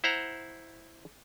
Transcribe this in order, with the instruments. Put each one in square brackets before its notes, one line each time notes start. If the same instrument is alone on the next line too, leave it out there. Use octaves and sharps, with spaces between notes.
[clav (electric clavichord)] E4 C5 F#5 A#5